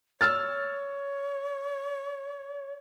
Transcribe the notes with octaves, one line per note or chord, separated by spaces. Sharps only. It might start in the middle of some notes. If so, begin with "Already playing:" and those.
C#5 E6 F6 A6